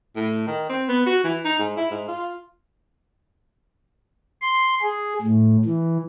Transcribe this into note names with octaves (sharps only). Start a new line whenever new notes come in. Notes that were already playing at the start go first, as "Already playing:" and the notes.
A2
D#3
C4
B3
F#4
E3
D#4
G#2
E4
G#2
F4
C6
G#4
A2
E3